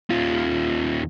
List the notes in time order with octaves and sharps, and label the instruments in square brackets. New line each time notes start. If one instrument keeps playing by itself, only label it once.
[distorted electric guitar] D#2 F4